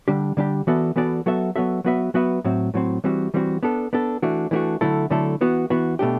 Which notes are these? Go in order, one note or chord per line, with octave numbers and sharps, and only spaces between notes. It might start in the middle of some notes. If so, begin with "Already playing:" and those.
D3 G3 D4 G4
D3 G3 D4 G4
E3 B3 F#4 A4 D5
E3 B3 F#4 A4 D5
F#3 B3 F#4 A4 E5
F#3 B3 F#4 A4 E5
F#3 B3 F#4 B4 E5
F#3 B3 F#4 B4 E5
A2 F#3 C4
A2 F#3 C4
E3 G3 C4 F#4
E3 G3 C4 F#4
B3 D4 A4
B3 D4 A4
E3 A3 D4 F#4
E3 A3 D4 F#4
D3 F#3 A3 E4 A4
D3 F#3 A3 E4 A4
E3 B3 F#4
E3 B3 F#4
B2 A3 D4 G4